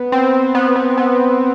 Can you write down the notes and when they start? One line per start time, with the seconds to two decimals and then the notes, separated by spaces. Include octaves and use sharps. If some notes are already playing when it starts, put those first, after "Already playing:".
Already playing: B3
0.12 C4
0.55 B3
0.76 B3
0.97 B3